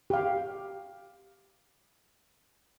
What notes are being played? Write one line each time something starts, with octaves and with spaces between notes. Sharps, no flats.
G4 F5